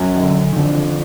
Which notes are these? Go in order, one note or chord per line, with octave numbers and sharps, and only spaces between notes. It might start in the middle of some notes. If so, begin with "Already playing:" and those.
Already playing: F#2
D#3
D3
D#3
F2 D3